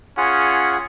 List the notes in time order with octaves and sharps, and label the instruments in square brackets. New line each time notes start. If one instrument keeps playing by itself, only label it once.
[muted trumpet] C#4 [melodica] F4 G#4 F#5